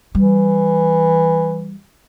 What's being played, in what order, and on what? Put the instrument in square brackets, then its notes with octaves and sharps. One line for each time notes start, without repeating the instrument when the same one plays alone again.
[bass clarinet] E3 [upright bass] G3